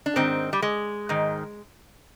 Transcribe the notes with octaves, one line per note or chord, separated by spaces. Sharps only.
D4
G#2 D#3 C4
G3
G#3
G#2 D#3